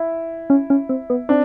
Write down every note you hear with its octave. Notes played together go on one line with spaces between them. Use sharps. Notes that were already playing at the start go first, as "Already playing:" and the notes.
Already playing: E4
C#4
C#4
C4
B3
C4 D4